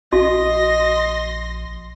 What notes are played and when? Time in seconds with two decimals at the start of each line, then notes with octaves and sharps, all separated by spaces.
0.13 A#1 F#4 D#5 C6 A#6